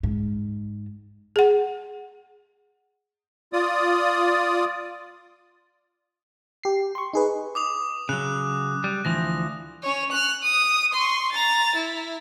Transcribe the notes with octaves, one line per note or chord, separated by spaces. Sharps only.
G#2
G#4 F#5
F4 D5 D#6
G4 C7
C6 C#6
D#4 G#4 B4
D6 D#6 F7
C#3 F#3 F#6
G3
D2 E3 F3 A#6
C#4 C#5
F6 F#6
D#6
C6 C#6
A#5 A6
E4